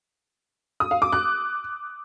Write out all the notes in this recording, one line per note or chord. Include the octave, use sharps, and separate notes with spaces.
D#6
F5
D6
F#6